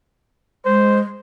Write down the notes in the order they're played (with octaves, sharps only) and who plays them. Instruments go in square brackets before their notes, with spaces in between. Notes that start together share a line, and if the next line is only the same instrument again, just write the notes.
[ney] G#3 [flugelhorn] C5